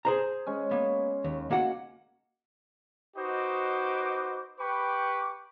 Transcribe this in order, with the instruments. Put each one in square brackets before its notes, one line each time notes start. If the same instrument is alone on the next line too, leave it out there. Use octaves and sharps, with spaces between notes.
[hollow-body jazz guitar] G#4 C5 A#5
[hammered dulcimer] G#3 C#4
[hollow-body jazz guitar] A#3 B3
D#2
A#3 F#4 F#5
[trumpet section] D#4 F#4 B4 C5 D#5 D6
G4 B4 G5 B5 C#6 D6